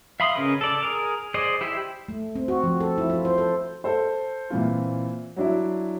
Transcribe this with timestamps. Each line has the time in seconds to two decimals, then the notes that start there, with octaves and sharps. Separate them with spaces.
0.20 E5 F5 B5 C6 D#6
0.35 C#3 C#4 A#4 B4 D#5
0.61 A4 D5
0.82 G#4 A#4
1.34 G#4 C5 D5 D#5
1.61 E4 G4 C5 E5
2.08 A3
2.35 C4
2.48 F#4
2.64 F3
2.81 A4
2.98 E4
3.10 F4
3.25 C5
3.38 A4
3.84 A4 C5
4.50 A#2 E3 C4 F4
5.36 F#3 D4 E4